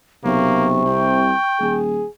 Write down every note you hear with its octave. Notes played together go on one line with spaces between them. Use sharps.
B1 C3 A#3 C#6
C2 G5
D#1 G#4